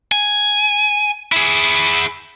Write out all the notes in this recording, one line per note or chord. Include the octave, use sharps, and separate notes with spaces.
G#5
E4 G#4